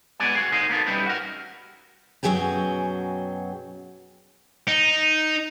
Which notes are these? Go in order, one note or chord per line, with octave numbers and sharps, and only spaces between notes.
G#3 B3 F#4 D5 G#5
F#4 G#4
D#4 A#4 C5 D#5
A#3 B3 D#4 A4
G3 C#4 D#4 E4 G4 B4
F#4 A#4
F#2 B2 F#3 G#4 G5 G#5
D#4